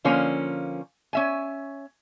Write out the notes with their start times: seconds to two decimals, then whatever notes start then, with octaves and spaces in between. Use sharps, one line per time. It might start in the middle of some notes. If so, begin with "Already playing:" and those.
0.04 D3 F3 A#3 C#4
1.13 C#4 E5 G#5